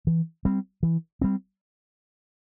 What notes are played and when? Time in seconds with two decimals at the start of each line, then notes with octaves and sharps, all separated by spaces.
0.07 E3
0.45 G3 C4
0.83 E3
1.21 G3 C4